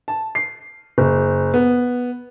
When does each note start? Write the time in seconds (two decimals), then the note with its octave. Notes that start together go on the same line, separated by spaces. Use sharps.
0.08 A5
0.35 C7
0.98 F#1
1.54 B3